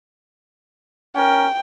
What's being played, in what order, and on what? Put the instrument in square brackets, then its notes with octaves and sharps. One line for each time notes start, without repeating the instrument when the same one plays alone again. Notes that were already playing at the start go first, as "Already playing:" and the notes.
[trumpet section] C#4 A#4 [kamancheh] G5